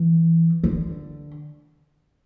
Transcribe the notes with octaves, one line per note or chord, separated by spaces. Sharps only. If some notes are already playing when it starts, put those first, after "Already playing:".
Already playing: E3
D3